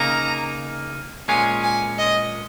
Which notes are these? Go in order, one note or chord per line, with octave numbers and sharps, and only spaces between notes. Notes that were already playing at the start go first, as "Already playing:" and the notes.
Already playing: C#3 A#3 D#4 A#5
A#2 G#3 C#4 F4 G#5
G#5
D#5